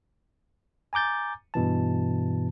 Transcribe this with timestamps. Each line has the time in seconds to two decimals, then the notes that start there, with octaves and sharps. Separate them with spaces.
0.93 G#5 A#5 D6 G6 A6
1.54 G2 B2 E3 A5